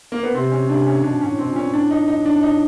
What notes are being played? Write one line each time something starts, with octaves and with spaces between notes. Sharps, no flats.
A#3
B3
C3 C4
C#4
C3 D4
C#4
B2 D4
G#2 C#4
A2
B2 C4
A#2
C#4
A2 D4
D#4
D#4
D4
D#4